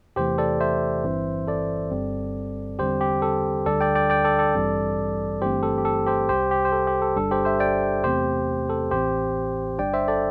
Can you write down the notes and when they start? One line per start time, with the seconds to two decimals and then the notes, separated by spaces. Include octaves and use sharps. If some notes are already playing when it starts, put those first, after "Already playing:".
0.16 E2 C3 E3 A3 G4 C5
0.38 A4 D5
0.61 C5 E5
1.04 G1 G2 E3 C4
1.48 A4 D5
1.91 G1 G2 G3 C4
2.79 E2 D3 G3 C4 G4 C5
3.01 G4
3.22 A4
3.66 D2 D3 G3 D4 A4 D5
3.81 D5 G5
3.95 D5 G5
4.10 D5 G5
4.25 A4 D5
4.39 A4 D5
4.54 A1 G2 E3 G3 C4
5.41 G1 G2 E3 A3 C4 G4 C5
5.63 A4
5.78 G4
5.85 A4
6.07 G4 C5
6.29 C2 C3 G3 G4 C5
6.51 G4
6.65 C5
6.72 A4
6.87 G4
7.02 A4
7.16 G1 G2 G3 D4 A4
7.31 G4 C5
7.45 C5 E5
7.60 D5 G5
8.04 E2 C3 A3 C4 G4 C5
8.69 A4
8.91 A1 A2 E3 C4 G4 C5
9.78 G1 G2 G3 D4 D5 G5
9.94 C5 E5
10.08 A4 D5